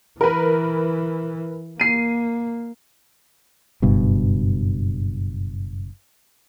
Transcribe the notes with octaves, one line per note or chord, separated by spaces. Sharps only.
E3 A#4 B4
A#3 C7 D#7
F#1 G2 B2